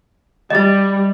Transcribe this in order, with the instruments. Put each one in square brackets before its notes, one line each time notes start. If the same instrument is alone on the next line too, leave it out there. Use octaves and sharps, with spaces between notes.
[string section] G3 [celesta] D#5 A6